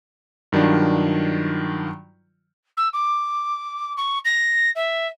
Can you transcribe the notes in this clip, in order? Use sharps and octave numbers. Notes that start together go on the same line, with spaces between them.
G2 D#3 F#3 D4 F4
E6
D6
C#6
A#6
E5